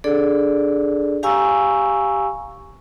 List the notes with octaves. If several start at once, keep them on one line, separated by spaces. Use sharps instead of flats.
D4 G#4 A4 D5
G4 F5 G#5 A#5 C#6 E6